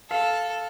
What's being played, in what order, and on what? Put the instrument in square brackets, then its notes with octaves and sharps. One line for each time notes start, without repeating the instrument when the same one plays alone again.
[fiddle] A4 [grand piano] F5